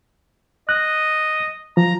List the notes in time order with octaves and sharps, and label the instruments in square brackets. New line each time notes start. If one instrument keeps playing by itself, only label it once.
[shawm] D#5 [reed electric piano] F#6
[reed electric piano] F3 [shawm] A#5